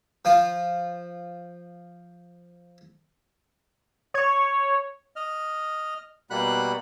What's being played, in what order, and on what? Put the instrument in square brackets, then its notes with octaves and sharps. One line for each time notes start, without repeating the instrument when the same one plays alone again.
[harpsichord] F3 F4
[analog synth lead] C#5
[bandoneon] D#5 F6
B2 G3 A#3 F#5 B5 F#6